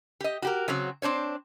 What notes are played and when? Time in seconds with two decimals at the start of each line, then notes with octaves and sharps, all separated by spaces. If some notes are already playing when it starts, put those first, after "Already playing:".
0.20 G4 D#5
0.42 F#4 G4 A#4
0.68 C#3 F#3 C4 F#4
1.02 C4 D4 C5 C#5